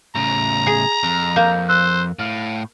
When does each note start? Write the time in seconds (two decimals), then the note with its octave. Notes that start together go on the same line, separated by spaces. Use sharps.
0.15 A2 C#3 A#5
0.67 G#4
1.03 F2
1.36 A#3 G6
1.69 C5 E6 F#6
2.19 A2 F5 F6